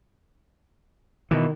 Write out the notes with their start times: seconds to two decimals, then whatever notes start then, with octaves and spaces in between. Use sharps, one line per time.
1.31 B2 D#3 E3